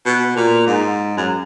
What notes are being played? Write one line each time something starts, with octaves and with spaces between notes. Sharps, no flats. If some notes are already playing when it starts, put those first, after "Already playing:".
B2
A#2
G#2
F#2